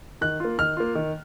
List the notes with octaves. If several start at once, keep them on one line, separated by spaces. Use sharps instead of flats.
D#3 F#6
A#3 F4
D#3 F6
A#3 F4
D#3